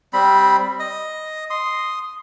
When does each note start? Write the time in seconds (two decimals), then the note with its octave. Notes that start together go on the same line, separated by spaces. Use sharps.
0.13 G3 C4 B5
0.80 D#5 D#6
1.50 C6 D#6